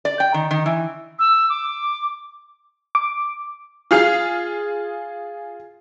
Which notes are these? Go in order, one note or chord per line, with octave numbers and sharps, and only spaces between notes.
D5
G5
D#3
D#3
E3
E6
D6
D6
F4 G#4 F6 C7